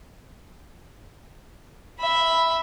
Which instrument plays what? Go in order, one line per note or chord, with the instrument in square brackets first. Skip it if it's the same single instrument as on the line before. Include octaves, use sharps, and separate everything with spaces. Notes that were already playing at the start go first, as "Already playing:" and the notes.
[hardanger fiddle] E5 B5